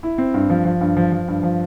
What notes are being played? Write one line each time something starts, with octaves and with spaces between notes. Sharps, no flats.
E4
C4
G2
F3
F3
G2
F3
F3
G2
F3